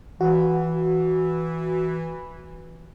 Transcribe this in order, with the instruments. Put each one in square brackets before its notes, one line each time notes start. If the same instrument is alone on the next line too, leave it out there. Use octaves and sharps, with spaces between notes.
[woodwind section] E3 [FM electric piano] F#4